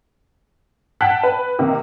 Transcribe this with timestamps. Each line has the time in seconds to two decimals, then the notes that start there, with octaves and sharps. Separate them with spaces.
1.01 F#5 G5 A5 F#6 B6
1.23 B4
1.59 C3 D#3 A#3